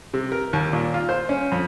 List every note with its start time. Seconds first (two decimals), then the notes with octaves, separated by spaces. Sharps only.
0.14 C3
0.32 A#4
0.53 D#2
0.73 A#2
0.94 F4
1.09 C5
1.29 C#4
1.52 F2